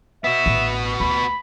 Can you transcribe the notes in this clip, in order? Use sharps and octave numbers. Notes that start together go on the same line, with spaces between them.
B3 F#4 E5
A1 D3
D2 B5